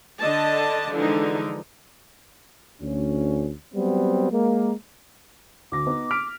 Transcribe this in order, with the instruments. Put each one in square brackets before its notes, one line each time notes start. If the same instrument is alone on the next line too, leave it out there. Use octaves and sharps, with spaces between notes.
[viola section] D3 D4 D#5 A5
D3 E3 F3 G#3 D#4
[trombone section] D2 C#4
F#3 G3 B3 C4
G#3 A#3
[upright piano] D2 A#6 [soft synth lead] D6
[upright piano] B3 D#4
F6 B6 D7